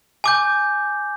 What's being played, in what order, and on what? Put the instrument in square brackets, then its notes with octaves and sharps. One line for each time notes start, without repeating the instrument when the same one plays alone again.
[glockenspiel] G#5 D6 G6